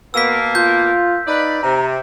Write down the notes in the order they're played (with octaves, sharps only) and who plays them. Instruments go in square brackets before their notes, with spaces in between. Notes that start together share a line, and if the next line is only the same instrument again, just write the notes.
[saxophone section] B2 A#3 [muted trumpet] B3 [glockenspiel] E6 B6
[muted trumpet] F4 [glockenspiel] G6
[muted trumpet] D#4 [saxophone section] B4 D5
[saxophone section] C3 [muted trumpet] A#5